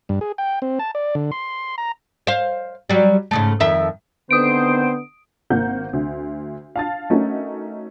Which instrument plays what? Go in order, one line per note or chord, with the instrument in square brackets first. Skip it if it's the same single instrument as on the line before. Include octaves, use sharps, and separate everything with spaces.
[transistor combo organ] G2
G#4
G5
C4
A5
D5
D3
C6
A#5
[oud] C5 F5
F#3 G3
G#2 C#3 A3
F2 D#3 E5
[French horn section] D3 B3 [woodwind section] D#3 C4 C5 [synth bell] D#6 D7
[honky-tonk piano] G#1 A#3 A#4 F#5 G6
D2
F5 A5 A6
A3 C#4 D#4 F#4 A#4